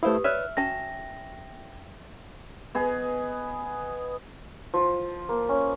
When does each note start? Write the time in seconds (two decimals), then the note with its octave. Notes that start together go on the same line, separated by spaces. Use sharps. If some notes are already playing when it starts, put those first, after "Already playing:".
0.03 A3 E4 G4 B4 C5 F5 D#6
0.24 B4 C#5 D5 E5 F6 F#6
0.57 C#4 F#4 G5 A5 A#6
2.75 B3 G#4 D#5
4.74 F3
5.29 A#3
5.49 C#4